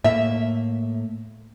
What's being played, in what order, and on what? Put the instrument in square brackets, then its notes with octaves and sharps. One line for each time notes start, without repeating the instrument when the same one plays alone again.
[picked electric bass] A2 A#3 [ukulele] E5